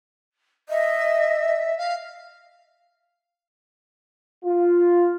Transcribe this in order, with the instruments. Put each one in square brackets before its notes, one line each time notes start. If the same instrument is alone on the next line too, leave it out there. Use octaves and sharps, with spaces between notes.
[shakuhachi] D#5 [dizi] E5
[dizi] F5
[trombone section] F4